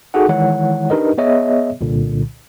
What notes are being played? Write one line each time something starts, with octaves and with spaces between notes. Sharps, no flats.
D#4 F#4 G#4 A4 F#5
D#3 E3 G#3 E4 C#5 F#5
D4 D#4 G4 A#4 B4 D#5
B3 G#4 C#5 D#5 E5
C2 A#2 D3